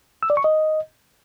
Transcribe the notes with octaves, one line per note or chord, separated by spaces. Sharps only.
E6
D5
C#6
D#5